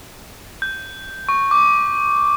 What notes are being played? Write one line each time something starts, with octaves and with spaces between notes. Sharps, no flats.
G6
C#6
D6